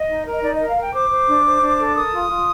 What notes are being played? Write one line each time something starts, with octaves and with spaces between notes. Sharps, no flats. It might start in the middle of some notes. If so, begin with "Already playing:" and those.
Already playing: D#5
D#4
A#4 D#5
D#4 D5
A#4 D#5
F5
A#4
G5
C5 D6
C5
D4
C5
D4
A4
A#4 D#6
F4
F4